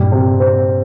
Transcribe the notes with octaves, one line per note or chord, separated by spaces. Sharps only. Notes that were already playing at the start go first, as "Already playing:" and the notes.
Already playing: G2 A#2 G3
C3
C4